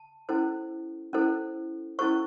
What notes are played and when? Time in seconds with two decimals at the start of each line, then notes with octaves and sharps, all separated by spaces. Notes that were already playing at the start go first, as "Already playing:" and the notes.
Already playing: A5
0.29 C#4 E4 A4 C5
1.13 C#4 E4 A4 C5
1.99 C#4 E4 A4 C5 C#6